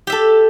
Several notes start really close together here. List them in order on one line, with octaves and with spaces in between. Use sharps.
G4 E5 A4